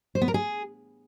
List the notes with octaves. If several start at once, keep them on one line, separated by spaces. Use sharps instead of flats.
C5
B3
A#4
G#4